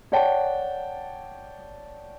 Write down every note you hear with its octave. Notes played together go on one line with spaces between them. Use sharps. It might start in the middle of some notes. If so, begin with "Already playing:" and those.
C#5 D5 F#5 G5 A5